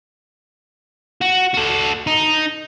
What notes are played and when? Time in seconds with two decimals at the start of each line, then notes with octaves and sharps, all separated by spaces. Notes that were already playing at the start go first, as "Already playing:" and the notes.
1.22 F#4
1.54 F#4 A4
2.07 D#4